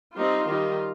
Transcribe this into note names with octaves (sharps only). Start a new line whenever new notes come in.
G3 C4 D#4 F4
D#3 G3 D#4